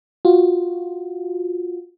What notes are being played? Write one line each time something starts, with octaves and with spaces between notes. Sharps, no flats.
F4 F#4